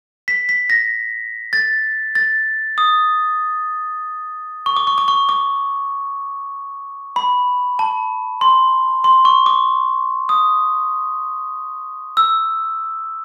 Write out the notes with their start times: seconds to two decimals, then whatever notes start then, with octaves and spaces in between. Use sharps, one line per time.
0.28 B6
0.49 B6
0.70 A#6
1.53 A6
2.15 A6
2.78 D#6
4.66 C#6
4.77 D6
4.87 C#6
4.98 D6
5.08 C#6
5.29 D6
7.16 B5
7.79 A5
8.41 C6
9.04 C6
9.25 C#6
9.46 D6
10.29 D#6
12.17 E6